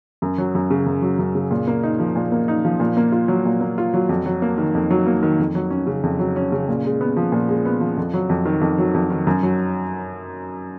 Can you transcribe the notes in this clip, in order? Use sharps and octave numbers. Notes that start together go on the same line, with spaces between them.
F#2
F#3
F#2
C#3
F#2
F#3
F#2
C#3
A#2
A#3
D#4
F3
A#2
A#3
D#4
F3
A#2
A#3
F4
F#3
A#2
A#3
F4
F#3
F2
F#3
A#3
D#3
F2
F#3
A#3
D#3
F2
F#3
C#4
C#3
F2
F#3
C#4
C#3
A#2
G#3
B3
F3
A#2
G#3
B3
F3
F2
F#3
F2
D#3
F2
F#3
F2
D#3
F#2
F#3